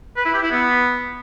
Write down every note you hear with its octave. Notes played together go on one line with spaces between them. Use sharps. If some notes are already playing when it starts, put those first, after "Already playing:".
B4
E4
G4
E4
B3